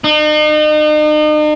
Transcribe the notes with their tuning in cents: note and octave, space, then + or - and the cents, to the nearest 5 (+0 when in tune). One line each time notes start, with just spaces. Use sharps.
D#4 -40